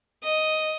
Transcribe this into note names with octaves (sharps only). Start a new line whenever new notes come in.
D#5